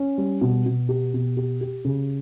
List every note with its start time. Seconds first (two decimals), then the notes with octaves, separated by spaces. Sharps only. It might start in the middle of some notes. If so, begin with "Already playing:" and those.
Already playing: C#4
0.18 G3
0.41 B2
0.66 B2
0.89 G4
1.14 B2
1.37 G4
1.61 G4
1.85 C#3